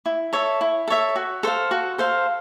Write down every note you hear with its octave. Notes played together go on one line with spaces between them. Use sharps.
E4
A4 C#5 E5
E4
A4 C#5 E5
F#4
A4 C5 F5
F#4
A4 C5 F5